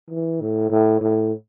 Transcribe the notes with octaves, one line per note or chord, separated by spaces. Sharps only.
E3
A2
A2
A2